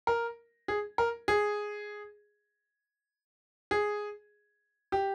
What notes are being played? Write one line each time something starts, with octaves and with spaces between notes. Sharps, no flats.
A#4
G#4
A#4
G#4
G#4
G4